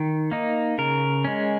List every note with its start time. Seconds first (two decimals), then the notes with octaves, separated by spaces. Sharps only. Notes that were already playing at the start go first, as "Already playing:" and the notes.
Already playing: D#3
0.32 A#3 D#4
0.78 C#3 A#4
1.25 G#3 C#4